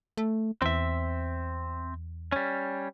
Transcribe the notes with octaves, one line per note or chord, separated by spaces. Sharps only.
A3
E2 C4 E5
G3 C#4